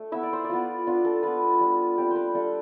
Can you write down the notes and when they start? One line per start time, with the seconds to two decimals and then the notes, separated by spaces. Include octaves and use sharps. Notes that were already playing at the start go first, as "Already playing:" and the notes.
Already playing: A3 D4 A4
0.12 B3 E4 E5
0.23 D5
0.33 C5
0.44 D5
0.49 B3 F4
0.87 B3 D4 F4
1.05 A4
1.23 B3 F4 B4
1.60 G3 D4 F4
1.98 G3 C4 F4 G4
2.11 C5
2.16 B4
2.34 G3 D4 F4 A4